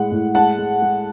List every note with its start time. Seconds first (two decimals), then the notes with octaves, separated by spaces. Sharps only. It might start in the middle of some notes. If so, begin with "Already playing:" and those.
Already playing: A2 G#3 F#5
0.11 A2
0.35 G#3 F#5 A5
0.58 G#3
0.82 G#3